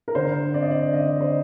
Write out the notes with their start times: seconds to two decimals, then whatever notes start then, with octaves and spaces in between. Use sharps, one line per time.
0.08 A#4
0.15 D3 C5
0.54 C4 D5
0.62 D#5
0.71 D5
0.93 D3 D#5
1.07 D5
1.21 C5